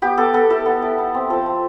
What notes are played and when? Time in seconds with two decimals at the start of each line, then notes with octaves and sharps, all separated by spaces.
0.02 B3 G4
0.17 B3 A4
0.34 B3 A4
0.50 E4 A4
0.66 B3
0.82 E4
0.98 E4
1.14 C4
1.30 F3 A4
1.46 C4